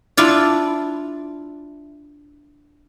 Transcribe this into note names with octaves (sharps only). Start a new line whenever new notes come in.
D4 E4 F4 D5